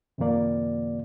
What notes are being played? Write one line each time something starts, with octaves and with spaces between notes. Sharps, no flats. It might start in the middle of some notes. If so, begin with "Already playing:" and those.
F#2 C3 D#3 F3 A#3 D5